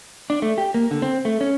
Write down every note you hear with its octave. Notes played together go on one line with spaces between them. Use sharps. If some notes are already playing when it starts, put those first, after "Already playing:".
D4
A3
G4
A#3
D3
C4
A3
C#4